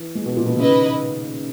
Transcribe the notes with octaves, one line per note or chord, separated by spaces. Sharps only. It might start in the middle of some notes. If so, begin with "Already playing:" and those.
Already playing: E3
G#3
B2
A#2
B2
C#3 E4 B4 D#5
D#3